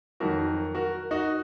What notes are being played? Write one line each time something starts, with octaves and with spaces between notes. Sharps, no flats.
F2 D#3 F#3 F#4 A#4
F#4 A#4
D#4 F#4